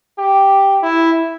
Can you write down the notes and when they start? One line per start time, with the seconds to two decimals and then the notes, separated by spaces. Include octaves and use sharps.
0.18 G4
0.82 E4